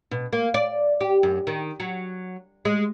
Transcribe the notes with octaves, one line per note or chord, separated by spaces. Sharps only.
B2
A#3
D5
G4
F#2
D#3
F#3
G#3